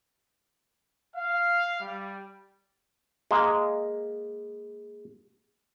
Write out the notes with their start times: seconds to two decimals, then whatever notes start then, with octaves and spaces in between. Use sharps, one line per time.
1.15 F5
1.80 G3
3.31 G#3 A#3